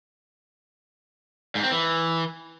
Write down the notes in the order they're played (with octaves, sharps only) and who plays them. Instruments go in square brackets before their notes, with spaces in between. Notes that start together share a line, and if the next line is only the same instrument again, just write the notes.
[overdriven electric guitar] G#2
C4
E3